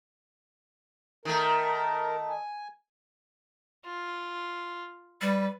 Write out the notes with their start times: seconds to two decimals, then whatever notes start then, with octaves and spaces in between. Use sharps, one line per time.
1.25 D#3 A3 A#4
2.30 G#5
3.85 F4
5.21 G3 B4